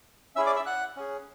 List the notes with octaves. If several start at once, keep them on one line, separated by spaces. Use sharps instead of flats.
C#4 E4 G#4 E5 E6
D5 D6
E5 E6
F#5 F#6
C#4 G#4